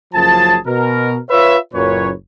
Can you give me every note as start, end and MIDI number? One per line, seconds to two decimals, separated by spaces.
0.14 0.58 30
0.14 0.58 42
0.14 0.58 53
0.14 0.58 68
0.14 0.58 81
0.66 1.17 47
0.66 1.17 70
1.30 1.57 65
1.30 1.57 71
1.30 1.57 73
1.30 1.57 76
1.74 2.11 30
1.74 2.11 42
1.74 2.11 46
1.74 2.11 71
1.74 2.11 73